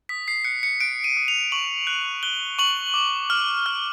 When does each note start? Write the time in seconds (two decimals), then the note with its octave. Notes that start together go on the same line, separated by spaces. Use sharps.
0.09 D#6 B6
0.28 C7
0.44 F#6 C#7
0.63 C#7
0.80 F#6 D7
1.04 D#7
1.17 D#6
1.28 F7
1.52 C#6 F#7
1.87 F#6
2.23 F#6 G7
2.59 C#6 F#7
2.94 D6
3.30 F6
3.66 F6